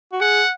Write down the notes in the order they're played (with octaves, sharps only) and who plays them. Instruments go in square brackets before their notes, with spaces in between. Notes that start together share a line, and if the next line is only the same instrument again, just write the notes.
[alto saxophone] F#4
[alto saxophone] G#4 [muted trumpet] F#5